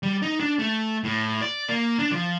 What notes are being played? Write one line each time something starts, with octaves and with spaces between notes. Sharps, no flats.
G3
D#4
D4
A3
A2
D5
A#3
D4
F3